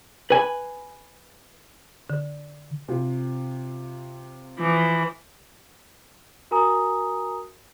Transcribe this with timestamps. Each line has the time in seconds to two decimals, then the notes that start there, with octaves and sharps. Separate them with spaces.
0.30 B4 G#5
2.10 D3
2.88 C3 F4
4.59 E3 F3
6.51 F#4 A#4 G#5 A#5 D#6